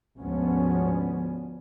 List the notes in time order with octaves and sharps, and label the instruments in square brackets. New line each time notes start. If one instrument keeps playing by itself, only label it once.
[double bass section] D2 G#2 F3 B3 C#4